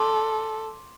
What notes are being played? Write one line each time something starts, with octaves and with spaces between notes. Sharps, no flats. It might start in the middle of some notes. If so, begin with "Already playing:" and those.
Already playing: A4 C6 D6